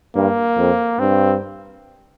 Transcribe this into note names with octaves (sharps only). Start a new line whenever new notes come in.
G2 A#3
F2
G2 C4